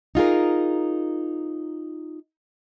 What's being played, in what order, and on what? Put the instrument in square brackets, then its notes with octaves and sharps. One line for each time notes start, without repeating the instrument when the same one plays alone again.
[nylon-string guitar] D#4 F4 G#4 A#4